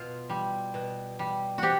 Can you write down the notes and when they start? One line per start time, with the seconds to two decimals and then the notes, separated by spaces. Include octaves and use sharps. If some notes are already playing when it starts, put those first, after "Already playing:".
Already playing: B2 F4
0.29 G3
0.74 B2
1.19 G3
1.58 C3 F#4 G4